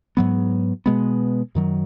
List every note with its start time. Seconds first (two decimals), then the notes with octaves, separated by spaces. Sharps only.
0.17 G#2 F#3 B3
0.86 B2 G#3 B3
1.55 F#2 D#3 F#3